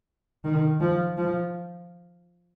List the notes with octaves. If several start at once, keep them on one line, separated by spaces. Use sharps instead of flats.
D#3
F3
F3